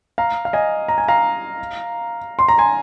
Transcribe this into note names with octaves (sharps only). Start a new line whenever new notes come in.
F5 A#5
F5
D#5 G#5
A#5
G#5
F5 A#5
C6
A#5
G#5 C6